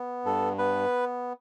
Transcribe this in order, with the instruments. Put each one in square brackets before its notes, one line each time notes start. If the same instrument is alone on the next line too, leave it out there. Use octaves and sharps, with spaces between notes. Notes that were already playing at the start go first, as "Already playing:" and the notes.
Already playing: [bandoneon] B3
G2 A4
B3 B4